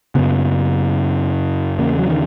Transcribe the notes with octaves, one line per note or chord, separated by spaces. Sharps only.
F#2 C#3 B3
E2 C#3 A#3
F#3
D#3